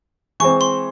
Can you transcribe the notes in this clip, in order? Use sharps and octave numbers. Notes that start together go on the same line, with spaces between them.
E3 G#3 C4 C#6
C6